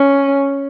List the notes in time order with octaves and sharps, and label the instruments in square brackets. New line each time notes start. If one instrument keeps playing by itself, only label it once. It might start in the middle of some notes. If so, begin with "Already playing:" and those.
Already playing: [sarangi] C#4